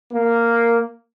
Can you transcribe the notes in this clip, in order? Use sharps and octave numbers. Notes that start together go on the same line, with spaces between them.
A#3